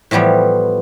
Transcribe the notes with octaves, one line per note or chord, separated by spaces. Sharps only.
A2 E3 F3 G3 B3